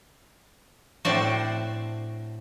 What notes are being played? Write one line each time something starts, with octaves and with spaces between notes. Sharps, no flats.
A2 C4 D4 F#4